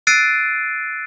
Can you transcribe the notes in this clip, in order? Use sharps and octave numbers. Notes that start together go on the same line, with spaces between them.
E6 F#6 A6 C7 D7 D#7